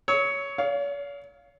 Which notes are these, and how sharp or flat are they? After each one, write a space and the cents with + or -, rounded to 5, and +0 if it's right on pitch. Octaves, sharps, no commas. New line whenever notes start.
C#5 +10 E6 -40
C#5 +45 F5 +0